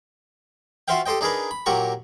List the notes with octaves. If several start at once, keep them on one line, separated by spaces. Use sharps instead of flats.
F4 F#4 C5 E5 F5 G5
G4 A4 C5 D#5 G5
D4 D#4 G#4 A#4 B4
B5
A#2 F#3 G4 A#4 A#5 C#6